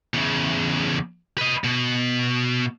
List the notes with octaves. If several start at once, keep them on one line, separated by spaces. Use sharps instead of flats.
E2 C#3
B4 D#5
B2